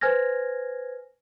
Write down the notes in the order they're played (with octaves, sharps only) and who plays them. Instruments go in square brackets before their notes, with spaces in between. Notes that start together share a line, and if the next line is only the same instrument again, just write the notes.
[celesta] B4 C5 G#5 F6 G#6 A#6